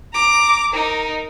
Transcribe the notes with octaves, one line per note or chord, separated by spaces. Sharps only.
A#5 D6
D#4 A#4